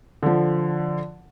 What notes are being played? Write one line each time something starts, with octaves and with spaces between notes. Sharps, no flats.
D3 F3